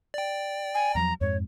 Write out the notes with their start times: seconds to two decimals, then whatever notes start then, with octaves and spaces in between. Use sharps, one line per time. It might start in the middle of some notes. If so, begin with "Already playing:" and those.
0.14 D5 G5
0.75 G#5
0.95 E2 F3 F#3 A#5
1.21 F2 G#2 G#3 C#5